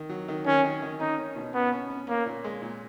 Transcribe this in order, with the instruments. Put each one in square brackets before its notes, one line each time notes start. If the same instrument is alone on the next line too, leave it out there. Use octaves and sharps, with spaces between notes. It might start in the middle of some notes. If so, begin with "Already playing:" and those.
Already playing: [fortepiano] D#3
F#3
D#3
[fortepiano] D#3 [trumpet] C#4
[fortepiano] D#3
D#3
[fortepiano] C#4 [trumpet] D#4
[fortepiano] C#4
B2
[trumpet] B3 [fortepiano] C#4
[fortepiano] C#4
C#4
[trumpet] A#3 [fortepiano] C#4
[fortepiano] A#2
G#3
A#2